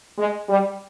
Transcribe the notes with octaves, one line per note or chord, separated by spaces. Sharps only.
G#3
G3